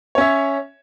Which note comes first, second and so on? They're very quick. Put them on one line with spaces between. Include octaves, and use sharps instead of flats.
C#5 C#4 E5